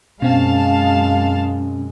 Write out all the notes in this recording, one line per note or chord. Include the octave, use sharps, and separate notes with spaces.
F#2 B2 G#3 C4 C#4 F5 A5